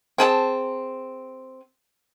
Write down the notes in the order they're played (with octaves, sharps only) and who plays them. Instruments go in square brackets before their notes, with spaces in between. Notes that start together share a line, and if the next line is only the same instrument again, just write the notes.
[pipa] C4 G#4 A5